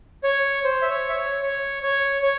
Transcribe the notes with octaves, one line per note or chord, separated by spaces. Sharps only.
C#5
C5
E5
C#5
E5
C#5
C#5
C#5
C#5